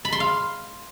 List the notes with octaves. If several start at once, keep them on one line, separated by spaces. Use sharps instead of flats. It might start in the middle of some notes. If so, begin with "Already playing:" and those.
B5
C6
F5